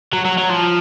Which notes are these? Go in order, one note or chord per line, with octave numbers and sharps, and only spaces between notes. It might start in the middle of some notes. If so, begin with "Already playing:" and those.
F#3
F#3
F#3
F3